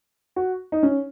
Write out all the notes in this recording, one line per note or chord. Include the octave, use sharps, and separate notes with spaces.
F#4
D#4
C#4